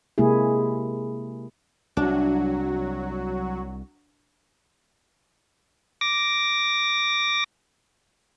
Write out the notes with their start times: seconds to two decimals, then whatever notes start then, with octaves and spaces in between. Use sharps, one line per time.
0.18 C3 G#3 A#3 E4 G#4
1.97 C2 F#3 D4 F#4
6.01 D6 A#6